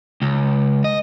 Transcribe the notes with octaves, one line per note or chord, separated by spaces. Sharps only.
C#2
D#5